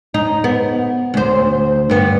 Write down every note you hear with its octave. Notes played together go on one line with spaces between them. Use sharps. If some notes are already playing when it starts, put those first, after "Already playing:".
D#4
B3
D2 C5
G2 B3